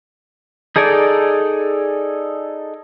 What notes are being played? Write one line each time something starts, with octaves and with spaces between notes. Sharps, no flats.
D#4 G#4 A4 D5 G#5